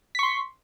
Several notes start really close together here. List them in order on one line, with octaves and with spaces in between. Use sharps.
B6 C#6 C6